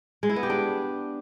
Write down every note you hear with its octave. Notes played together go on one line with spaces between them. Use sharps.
G#3
E4
B3
G4
D4